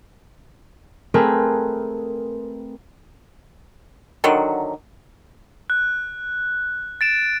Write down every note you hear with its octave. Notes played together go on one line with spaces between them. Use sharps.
A3 C4 G#4 A#4 B4
D3 D#3 F#3
F#6
A6 D7 E7